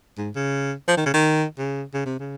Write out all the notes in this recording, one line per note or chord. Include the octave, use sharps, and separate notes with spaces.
G#2
C#3
F3
D#3
C#3
D#3
C#3
C#3
C3
C#3